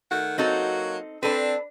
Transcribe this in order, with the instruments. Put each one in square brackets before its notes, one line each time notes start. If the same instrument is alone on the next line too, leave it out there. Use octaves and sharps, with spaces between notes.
[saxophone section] D#3 A3 F#5
[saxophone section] F#3 A#3 F#4 [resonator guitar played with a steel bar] C4 D#4 A4
[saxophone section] C4 A4 [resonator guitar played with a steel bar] D4 B4